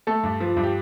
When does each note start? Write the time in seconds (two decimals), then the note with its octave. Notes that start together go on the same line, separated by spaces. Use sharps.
0.07 A3 A4
0.23 G2
0.40 F3
0.57 G2
0.63 G4